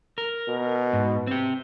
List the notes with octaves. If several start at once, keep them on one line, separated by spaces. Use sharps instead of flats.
A#4
B2
G#2
C4 G4